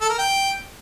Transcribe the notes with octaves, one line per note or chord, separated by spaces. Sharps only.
A4
A#4
G5